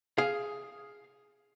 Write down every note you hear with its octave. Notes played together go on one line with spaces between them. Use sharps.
G#4 F5